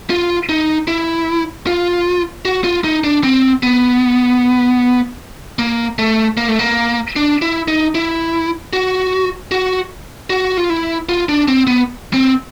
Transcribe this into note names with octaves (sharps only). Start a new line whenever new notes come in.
F4
D#4
E4
F4
F#4
F4
D#4
D4
C4
B3
A#3
A3
A#3
A3
A#3
D4
E4
D#4
E4
F#4
F#4
F#4
F4
E4
F4
D4
C4
B3
C4